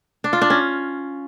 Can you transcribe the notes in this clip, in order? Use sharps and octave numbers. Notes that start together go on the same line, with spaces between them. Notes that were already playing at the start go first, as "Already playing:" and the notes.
D4
F4
D4
C#4